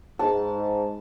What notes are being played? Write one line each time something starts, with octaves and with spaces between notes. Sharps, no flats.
G#2 A5 B5